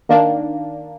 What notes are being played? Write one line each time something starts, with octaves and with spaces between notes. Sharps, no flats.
D#3 A#3 D4